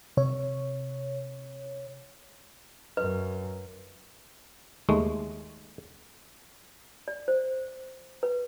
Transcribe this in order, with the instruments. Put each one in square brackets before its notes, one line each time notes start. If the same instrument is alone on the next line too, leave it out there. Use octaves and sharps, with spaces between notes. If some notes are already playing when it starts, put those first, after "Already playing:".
[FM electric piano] C3 C#5
[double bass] F#2 [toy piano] B4
[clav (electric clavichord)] D#2 G#3 A3
[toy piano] D5
C5
B4